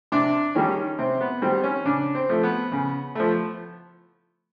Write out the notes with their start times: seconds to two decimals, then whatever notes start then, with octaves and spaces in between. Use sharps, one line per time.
0.12 C3 D4
0.55 D#3 G3 C#4
0.99 C3 C4
1.21 B3
1.42 D#3 G3 C4
1.63 C#4
1.85 C#3 D4
2.15 C4
2.29 F3 A3
2.43 B3
2.72 C#3
3.15 F3 A3